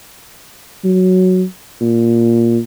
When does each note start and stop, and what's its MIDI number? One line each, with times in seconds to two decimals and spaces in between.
0.84 1.44 54
1.81 2.59 46